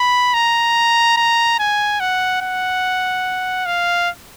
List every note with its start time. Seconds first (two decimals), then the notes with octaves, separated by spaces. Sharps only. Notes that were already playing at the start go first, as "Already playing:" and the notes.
Already playing: B5
0.34 A#5
1.17 A#5
1.59 G#5
2.00 F#5
2.41 F#5
3.66 F5